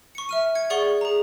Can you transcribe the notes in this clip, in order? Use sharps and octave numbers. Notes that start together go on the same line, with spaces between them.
C#6 C#7
E5 F6 D#7
G#6 C#7
G#4 D5 F#5 C#6 G7
G#4 A#5